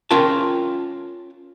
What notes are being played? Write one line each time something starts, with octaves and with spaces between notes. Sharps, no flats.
C#4 F4 A#4 G5 A5